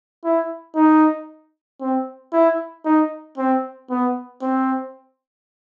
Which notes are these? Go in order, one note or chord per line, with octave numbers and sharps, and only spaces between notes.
E4
D#4
C4
E4
D#4
C4
B3
C4